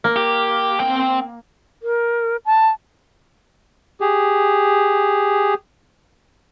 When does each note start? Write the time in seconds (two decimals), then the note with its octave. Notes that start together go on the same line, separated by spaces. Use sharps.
0.04 A#3
0.16 G4
0.80 C4 G5
1.83 A#4
2.46 A5
4.01 G4 G#4